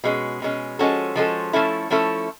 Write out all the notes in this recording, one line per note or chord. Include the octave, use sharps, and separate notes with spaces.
B2 G#3 C#4
B2 G#3 C#4
F3 G#3 C#4 F#4 A4
F3 G#3 C#4 F#4 A4
F3 A3 C#4 E4 A4
F3 A3 C#4 E4 A4